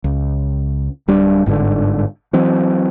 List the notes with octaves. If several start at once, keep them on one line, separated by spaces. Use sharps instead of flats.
C#2
D1 G3 D4
G1 G#2 B2 D3
E3 F#3 C4